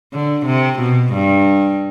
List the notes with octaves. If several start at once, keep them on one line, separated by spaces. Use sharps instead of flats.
D3
C3
B2
G2